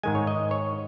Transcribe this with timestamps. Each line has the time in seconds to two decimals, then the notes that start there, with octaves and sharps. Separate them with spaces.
0.03 G#2 D#3 G#3 G#5
0.15 C#5
0.27 D#5
0.51 C#5